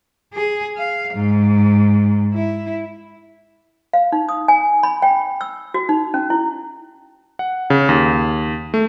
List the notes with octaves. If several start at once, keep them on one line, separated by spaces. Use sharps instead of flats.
G#4
F5
G#2
E4
F5
D#4
D#6
G#5
B5
G5
E6
F#4
D#4
C#4
E4
F#5
C#3
D#2
A3